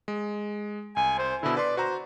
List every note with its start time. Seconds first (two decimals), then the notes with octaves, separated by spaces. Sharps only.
0.08 G#3
0.96 C2 G#5
1.19 C5
1.43 B2 D3 E4
1.57 B4 D5 C6
1.77 F#4 C5 A#5